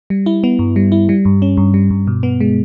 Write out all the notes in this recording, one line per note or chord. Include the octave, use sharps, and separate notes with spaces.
G3
E4
B3
G2
G3
E4
G3
G2
C#4
G2
G3
G2
B2
B3
G#3